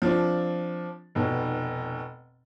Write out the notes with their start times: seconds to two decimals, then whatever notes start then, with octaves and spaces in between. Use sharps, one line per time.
0.02 F3 C4 D4
1.15 F1 B2